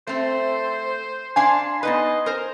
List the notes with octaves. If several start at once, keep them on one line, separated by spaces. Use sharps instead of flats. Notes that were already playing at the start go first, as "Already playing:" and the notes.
A3 C4 C5
D4 F5 G#5 C6
B3 D#4 B4 D#5
A#4 C5